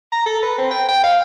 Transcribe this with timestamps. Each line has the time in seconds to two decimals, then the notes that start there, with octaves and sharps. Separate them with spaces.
0.12 A#5
0.26 A4
0.43 B4
0.58 C4
0.71 G5
0.89 G5
1.04 F5